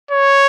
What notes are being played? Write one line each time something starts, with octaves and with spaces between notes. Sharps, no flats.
C#5